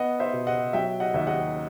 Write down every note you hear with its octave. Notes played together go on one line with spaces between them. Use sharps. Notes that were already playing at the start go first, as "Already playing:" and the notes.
Already playing: B3 D#5 F#5
C5 E5
B2
D#5 F#5
F#3 E5 G5
D#5 F#5
D#2 E5
D#5 F#5